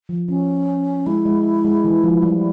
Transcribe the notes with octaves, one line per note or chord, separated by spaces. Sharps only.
F3
F3 C#4
G#3 E4
G#3
G#3
E3
F3
G3